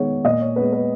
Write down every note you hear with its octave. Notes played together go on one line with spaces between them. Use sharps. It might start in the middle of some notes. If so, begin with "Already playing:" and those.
Already playing: D#3 G#3 B3 C#5
A#2 D#5
C#5
G#3 B3 B4
B4